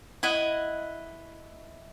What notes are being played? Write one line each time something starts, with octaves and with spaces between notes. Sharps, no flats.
E4 D#5 F#5